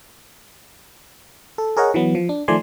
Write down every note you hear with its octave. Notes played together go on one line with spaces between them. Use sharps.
A4
G#4 A#4 C#5 D#5 F#5
E3 F#3 B3
F3
D4
D#3 F3 A3 D5 G#5 C6